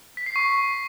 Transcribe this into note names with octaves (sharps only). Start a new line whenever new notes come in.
B6
C7
C#6